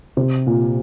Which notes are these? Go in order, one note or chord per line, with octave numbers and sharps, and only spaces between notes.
C3
A#2